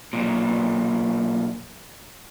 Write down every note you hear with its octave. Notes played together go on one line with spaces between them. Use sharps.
B1 A#2